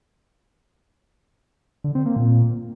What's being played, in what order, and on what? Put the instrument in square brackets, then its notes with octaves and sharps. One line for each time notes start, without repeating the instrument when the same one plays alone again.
[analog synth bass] D3
C4
A#3
A#2